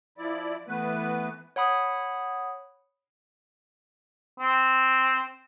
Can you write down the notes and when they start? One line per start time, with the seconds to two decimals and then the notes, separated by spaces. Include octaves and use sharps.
0.18 F3 E4 D5
0.68 E3 A3 B3 B4
1.56 C#5 F#5 B5 D#6
4.40 C4